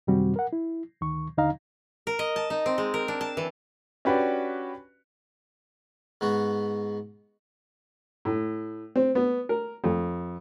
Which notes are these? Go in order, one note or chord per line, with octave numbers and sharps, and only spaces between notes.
F#2 C3 D#3 G3 C4 F#4
A#4 F#5
E4
D2 D#3 C#6
D#2 D3 D#4 D#5 F5 A#5
A#4
D#5
A5
D#4
C4
G#3
A#4
D4
A5
E3
C#4 D4 F#4 G4 B4 D5
G#2 B3 F#4
A2
C4
B3
A#4
F2